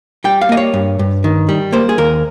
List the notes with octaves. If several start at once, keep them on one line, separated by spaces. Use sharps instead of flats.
G3 G5
F5
A#3 D#5
C#5
G2
G2
D#3
G3
A#3 C5
G#4
D#2 A#4